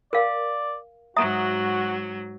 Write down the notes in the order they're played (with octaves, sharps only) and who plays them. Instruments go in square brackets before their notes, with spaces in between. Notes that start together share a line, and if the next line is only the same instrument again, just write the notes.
[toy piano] A#4 F5 [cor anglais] D5
[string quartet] G#2 F#3 [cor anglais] F#4 [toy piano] E5 A#5 D#6